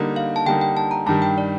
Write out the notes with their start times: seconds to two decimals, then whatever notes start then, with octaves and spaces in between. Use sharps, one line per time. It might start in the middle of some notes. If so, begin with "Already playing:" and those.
Already playing: D3 G3 A#3 D#4
0.16 F5
0.36 A5
0.46 D3 G3 A#3 D#4 G5
0.61 G5
0.77 A5
0.91 A#5
1.06 G2 D#3 G3 A5
1.22 G5
1.38 D5